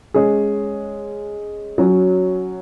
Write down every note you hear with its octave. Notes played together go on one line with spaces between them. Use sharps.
G#3 C#4 G#4
F#3 C#4 F#4